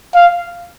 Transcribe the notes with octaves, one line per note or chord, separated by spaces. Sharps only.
F5